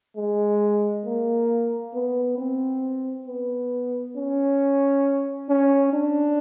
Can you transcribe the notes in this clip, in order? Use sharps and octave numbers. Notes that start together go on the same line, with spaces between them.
G#3
A#3
B3
C4
B3
C#4
C#4
D4